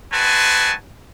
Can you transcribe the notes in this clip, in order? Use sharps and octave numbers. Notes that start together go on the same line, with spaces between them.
G#3 C4 F#4 B4 G#5 A5